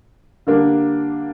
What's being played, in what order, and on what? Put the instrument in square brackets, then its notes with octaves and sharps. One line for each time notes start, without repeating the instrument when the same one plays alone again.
[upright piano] D3 G3 A#3 D4